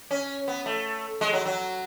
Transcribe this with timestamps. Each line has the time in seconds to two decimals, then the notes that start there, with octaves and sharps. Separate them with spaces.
0.11 C#4
0.48 B3
0.66 A3
1.21 G#3
1.33 F#3
1.46 F#3